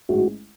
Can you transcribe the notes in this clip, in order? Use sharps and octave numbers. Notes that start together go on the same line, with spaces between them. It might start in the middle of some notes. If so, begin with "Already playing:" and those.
A1 G#2 G#3 C#4 E4 F#4